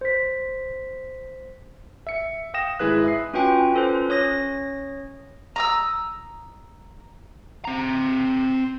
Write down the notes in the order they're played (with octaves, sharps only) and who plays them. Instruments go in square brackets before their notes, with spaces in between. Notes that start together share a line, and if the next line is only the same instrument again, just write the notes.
[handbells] C5 B6
[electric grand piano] E5 C#7
F5 G5 D#6 A#6 E7
G#1 G#3 E4 G#4 B4 F#6
E5 D#6 C7
[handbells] C#4 F4 F#4 B4 G5 G#5
C#4 F4 A4 B4 C5
C#4 C#5 D#6 A#6
[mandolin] A#5 D#6 E6
[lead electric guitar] C4 A#5